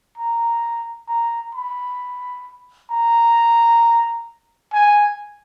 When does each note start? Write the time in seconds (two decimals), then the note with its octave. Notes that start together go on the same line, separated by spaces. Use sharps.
0.18 A#5
1.09 A#5
1.55 B5
2.90 A#5
4.73 G#5